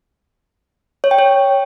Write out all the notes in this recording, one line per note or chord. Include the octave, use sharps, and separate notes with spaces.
C#5
G5
C#5